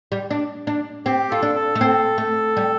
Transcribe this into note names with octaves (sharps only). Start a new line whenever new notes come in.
G3
D4
D4
C4 G4
F4 A4
D4
A4
A3
C4
A3
G3